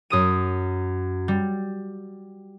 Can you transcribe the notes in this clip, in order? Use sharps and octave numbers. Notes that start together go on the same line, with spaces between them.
F#2 D#6 D#7
G3